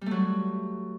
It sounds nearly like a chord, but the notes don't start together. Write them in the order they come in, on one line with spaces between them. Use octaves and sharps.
G3 A3 F#3